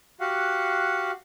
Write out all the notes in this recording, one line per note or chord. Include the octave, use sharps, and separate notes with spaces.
F#4 G4 F5 F#5